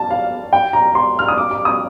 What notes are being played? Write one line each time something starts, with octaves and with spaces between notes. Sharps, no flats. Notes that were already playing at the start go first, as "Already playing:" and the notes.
Already playing: A5
F5
G5
A#5
C6
F6
D#6
D6
D6
D#6